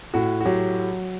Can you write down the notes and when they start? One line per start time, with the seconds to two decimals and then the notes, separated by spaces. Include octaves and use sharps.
0.14 A2 F#4
0.40 F#4
0.45 F#3 G4